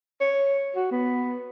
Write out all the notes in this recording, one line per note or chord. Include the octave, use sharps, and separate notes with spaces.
C#5
F#4
B3